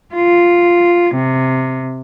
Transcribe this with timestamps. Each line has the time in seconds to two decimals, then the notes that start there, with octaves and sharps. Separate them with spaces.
0.15 F4
1.15 C3